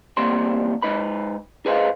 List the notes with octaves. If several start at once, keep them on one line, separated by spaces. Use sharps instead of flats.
E2 G3 A#3 C4 C6
G#2 D#4 B4 B5
G#4 B4 C5 D#5 F5